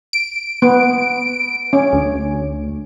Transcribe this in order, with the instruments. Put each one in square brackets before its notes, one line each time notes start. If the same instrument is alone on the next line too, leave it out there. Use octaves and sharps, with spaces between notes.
[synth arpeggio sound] D7
[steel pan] B3
C#4
[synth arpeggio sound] D2